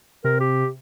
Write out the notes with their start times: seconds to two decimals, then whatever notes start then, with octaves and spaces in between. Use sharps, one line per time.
0.24 C3 A#4
0.40 G4